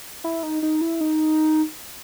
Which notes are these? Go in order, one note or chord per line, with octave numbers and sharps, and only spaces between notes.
E4
D#4
D#4
E4
D#4